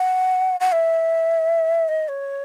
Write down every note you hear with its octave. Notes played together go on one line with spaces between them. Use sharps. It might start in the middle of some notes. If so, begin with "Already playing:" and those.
Already playing: F#5
F#5
E5
D#5
C#5